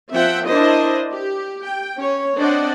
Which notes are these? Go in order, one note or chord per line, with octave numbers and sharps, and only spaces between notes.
F3 C4 E5 F#5 G5
D4 E4 A#4 C5 D#5
G4
G5
C#4 C#5
C4 D4 C5 D5 D#5 F#5